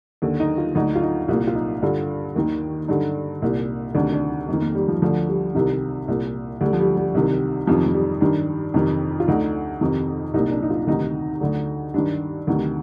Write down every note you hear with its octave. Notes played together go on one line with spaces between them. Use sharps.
D#2 D3
D#4
F4
D2 D3 D#4
F4
D#4
C2 A#2 F4
F4
D#4
G2 D3 F4
D#2 D#3
G2 D3 D#4
C2 A#2
D2 C3 D#3 D4
D4
F2
D#3
A#3
G3
F3
D2 D3 F3
G3
C2 C3 D#3
C2 A#2
D2 D3 G3
F3
G3
G3
C2 C3 D#3
F2 C3 D#3 F3
F3
G3
G2 D#3 D4
F2 C3 D#3
F4
D2 D3 D#4
F2 C3 D#3
C2 A#2 D#4
D4
D#4
F4
D2 C3 D#3 D#4
D2 D3
G2 D#3 D4
D2 C3 D#3